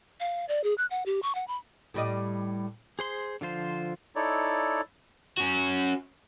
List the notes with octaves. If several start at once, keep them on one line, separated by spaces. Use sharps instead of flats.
F5
D5
G#4
F#6
F#5
G4
C#6
F#5
B5
A2 G3 D#5
G#4 C5 C6
D3 F3 F4 C5
D#4 E4 A4 C#5 D5
C#4 F#4